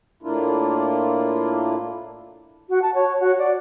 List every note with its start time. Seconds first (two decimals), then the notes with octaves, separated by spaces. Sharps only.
0.23 A2 A#3 D4 E4 F4
2.69 F#4
2.82 A5
2.95 C#5
3.20 F#4
3.39 D5